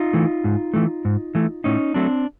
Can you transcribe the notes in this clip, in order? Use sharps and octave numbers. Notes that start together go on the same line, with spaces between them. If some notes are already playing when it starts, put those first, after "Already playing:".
Already playing: D#4 F4
E3 A3
G#2
E3 A3
G#2
E3 A3
A2 C#4 D#4
F#3 A3 C4 D4